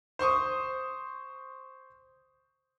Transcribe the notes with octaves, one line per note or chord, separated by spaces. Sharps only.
C5 C6 C#6 D#6